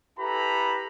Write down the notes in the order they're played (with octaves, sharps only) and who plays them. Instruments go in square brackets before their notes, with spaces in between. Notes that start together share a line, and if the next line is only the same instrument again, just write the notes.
[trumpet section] E4 G4 A4 B4 A#5 B5